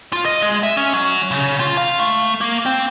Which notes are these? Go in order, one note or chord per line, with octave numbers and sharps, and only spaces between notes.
F4
D#5
G#3
E5
C#4
F#3
C#3
F4
F5
A3
A#3
C4